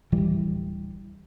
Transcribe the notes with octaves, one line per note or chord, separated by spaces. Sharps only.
D1 A1 E3 G3